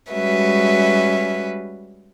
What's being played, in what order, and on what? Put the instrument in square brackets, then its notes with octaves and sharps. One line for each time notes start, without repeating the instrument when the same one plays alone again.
[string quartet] G3 G#3 C#4 F#4 B4 E5